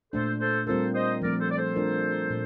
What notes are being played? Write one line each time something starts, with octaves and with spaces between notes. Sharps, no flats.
A#2 A3 D4 A4 C5
A4 C5
G3 C4 F4 A4 A#4 C5
C5 D#5
F3 A3 C4 A#4 D5
A4 C5
D5
A4 C5
F3 A3 D4 F4 A#4
A#2